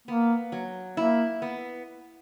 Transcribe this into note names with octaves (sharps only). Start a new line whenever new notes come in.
A#3 B3
F#3
A#3 E4
B3